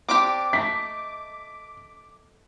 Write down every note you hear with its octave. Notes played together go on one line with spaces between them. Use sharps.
C4 D4 G4 D6
A3 D#4 B6